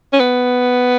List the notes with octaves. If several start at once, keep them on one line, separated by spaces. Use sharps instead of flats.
C#4
B3